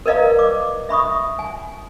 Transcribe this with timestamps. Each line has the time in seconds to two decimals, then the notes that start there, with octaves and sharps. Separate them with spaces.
0.06 A#4 B4 D5 D#5 F5 A#5
0.39 D6
0.89 E5 B5 C#6 D#6
1.39 G#5